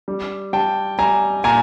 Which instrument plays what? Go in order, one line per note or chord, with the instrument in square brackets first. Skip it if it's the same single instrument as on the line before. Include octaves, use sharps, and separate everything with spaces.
[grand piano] G3
G3 G5 A5
G3 G#5 A#5
A#2 G#5 A#5